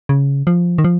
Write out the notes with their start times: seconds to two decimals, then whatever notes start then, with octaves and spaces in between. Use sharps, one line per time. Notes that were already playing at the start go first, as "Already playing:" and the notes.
0.09 C#3
0.47 F3
0.78 D#3
0.84 F3